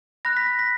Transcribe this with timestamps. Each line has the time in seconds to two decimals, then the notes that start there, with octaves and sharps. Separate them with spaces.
0.25 B5 F#6 A#6
0.37 B6
0.47 A#6
0.59 B6